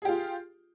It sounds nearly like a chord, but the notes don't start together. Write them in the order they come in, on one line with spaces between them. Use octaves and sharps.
G#4 G4 F4